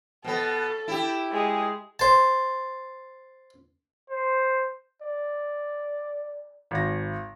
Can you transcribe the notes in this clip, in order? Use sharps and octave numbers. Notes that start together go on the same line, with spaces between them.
B2 B3 A4
E4 G4
G#3 G#4
C5 A5
C5
D5
G#1 A#6